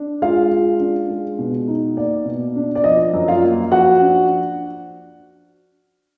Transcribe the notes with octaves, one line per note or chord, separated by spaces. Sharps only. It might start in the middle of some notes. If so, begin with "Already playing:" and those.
Already playing: D4
G#3 F4 F5
F4
D4
G#3
B2
D#4
A#3 D5
B2
D4
D5
F3 D#5
F#2
F4 F5
A#3
F3 F#4 F#5
D4